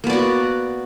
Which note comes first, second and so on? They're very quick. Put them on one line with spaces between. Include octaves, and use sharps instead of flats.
A#3 B3 D5 F#4